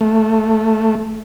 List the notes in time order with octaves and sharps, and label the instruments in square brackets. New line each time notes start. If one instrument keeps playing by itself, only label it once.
[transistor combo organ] A3